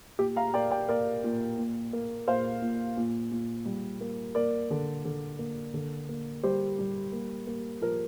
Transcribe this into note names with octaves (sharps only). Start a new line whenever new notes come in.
A#2 G4
F5 A#5
A#3 D5 G5
D5 G5
A#3 A#4 D5
A#2
A#2
A#3
A#2 C5 F5
A#2
A#2
A#2
G3
A#3
A#3 A#4 D5
D3
D3
A#3
D3
A#3
G3 G4 C5
G3
A#3
A#3
F3 A#4